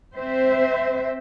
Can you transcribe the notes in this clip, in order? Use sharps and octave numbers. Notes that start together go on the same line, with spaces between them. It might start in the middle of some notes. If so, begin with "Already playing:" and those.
C4 C5 E5